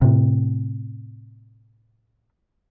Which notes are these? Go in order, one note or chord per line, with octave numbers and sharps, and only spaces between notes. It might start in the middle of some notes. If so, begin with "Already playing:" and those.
A2 C3